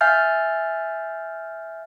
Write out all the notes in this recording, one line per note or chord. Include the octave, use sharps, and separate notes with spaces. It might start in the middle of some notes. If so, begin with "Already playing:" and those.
E5 F5 G#5 F6 G6 A6